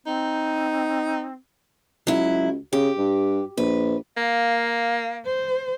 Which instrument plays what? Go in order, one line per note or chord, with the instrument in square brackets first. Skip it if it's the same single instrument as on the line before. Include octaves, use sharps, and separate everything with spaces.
[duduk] C4 [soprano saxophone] D#4
[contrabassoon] C#2 [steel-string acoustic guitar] F#3 E4
[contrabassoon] C#3 [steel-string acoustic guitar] G4
[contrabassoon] G2
[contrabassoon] A#1 [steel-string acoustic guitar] B4
[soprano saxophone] A#3 [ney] F5
[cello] C5